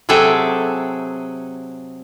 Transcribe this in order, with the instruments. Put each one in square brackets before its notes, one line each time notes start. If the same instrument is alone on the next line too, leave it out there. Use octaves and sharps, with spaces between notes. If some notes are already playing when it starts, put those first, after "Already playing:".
[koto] C3 F#3 G#4 A4 E5 G5